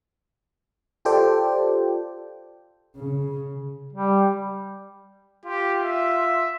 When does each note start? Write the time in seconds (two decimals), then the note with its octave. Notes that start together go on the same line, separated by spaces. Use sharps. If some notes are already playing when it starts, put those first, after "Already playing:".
1.05 F4 G4 A4 C5 D5 G5
2.96 C#3
3.93 G3
5.45 F4 G4
5.82 E5